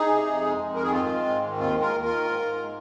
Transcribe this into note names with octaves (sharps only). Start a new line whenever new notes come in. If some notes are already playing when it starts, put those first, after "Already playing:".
Already playing: D#4 G#4
C3
F2
G#3
F2
D#3 A#4
G#4
G#2 C4 F4
G#3
G#2
D#3
D#2 C4 F4
G#3
F4 A#4
D#2
F4 A#4
D#3
G#2
G#2
G#3